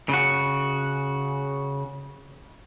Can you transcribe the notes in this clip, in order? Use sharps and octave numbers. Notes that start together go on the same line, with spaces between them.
C#3 F#4